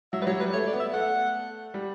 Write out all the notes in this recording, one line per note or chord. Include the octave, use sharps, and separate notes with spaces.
F#3 E5
G3 B4
F#3 C#5
G3 B4
A3 C#5
D5
B3
E5
A3 F#5
G3